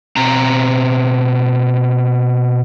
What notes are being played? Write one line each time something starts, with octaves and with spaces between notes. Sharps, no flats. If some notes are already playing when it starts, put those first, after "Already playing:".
B2 C4 A#5